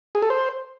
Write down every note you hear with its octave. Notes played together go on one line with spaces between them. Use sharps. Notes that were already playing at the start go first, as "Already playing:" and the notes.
G#4
A4
C5